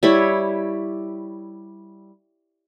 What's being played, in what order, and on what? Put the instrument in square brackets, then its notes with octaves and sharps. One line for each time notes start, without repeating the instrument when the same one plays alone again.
[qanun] G3 E4 C#5 E5